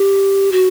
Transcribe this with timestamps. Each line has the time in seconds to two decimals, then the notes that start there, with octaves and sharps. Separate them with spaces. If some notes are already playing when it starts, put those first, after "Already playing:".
Already playing: G4
0.52 F#4